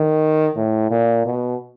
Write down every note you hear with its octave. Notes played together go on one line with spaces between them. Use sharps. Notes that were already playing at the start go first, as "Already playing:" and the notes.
Already playing: D#3
A2
A#2
B2